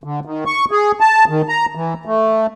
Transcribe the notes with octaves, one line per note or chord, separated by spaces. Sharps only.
D3
D#3
C#6
G#4
A5
D#3
A#5
E3
A3